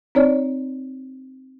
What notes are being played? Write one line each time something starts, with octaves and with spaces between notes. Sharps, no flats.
C4 D#4 C#5 D5